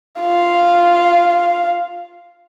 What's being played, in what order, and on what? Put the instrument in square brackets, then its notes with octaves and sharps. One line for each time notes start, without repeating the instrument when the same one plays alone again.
[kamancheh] F4 F5